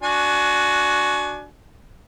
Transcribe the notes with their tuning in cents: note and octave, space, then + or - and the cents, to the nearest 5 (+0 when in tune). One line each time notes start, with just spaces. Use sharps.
D4 +5 F#4 +0 G#5 +30